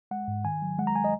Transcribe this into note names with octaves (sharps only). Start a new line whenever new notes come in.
G#3 F#5
G#2
D#3 G#5
F#3
G#3 F#5
A#5
G#5
D#5